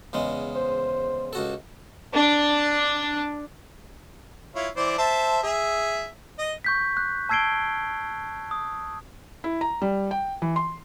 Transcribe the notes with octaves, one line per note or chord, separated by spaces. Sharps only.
E2 C#3 G#3
C5
C#2 F#4 A4
D4
E4 F4 C#5
E3 C5 D5
C5 E5 A5
G#4 E5
D#5
C#6 G6 B6
F#6
A5 E6 G#6 C7 D7 G7
D#6
E4
A#5
G3
G5
E3
C6